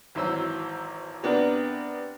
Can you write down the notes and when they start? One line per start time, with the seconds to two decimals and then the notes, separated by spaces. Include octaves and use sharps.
0.15 G#1 E3 F#3 C5 E6
1.23 C3 B3 D4 A#4